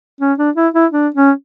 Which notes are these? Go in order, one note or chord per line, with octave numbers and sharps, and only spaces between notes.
C#4
D4
E4
E4
D4
C#4